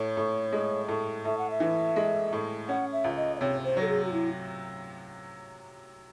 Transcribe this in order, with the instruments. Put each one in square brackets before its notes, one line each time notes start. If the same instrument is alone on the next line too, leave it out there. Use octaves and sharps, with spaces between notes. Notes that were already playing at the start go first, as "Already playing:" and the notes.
Already playing: [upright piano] A2 [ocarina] C#5
[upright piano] A2
G#3
A2
[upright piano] A2 [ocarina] E5
[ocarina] F#5
E5
[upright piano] E3
G#3
A2
[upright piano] C#4 [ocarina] F#5
[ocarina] E5
[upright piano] C#2
[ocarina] D#5
D#5
[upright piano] C3 [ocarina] C#5
[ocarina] C5
[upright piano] F#3 [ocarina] A4
[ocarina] G#4
F#4
E4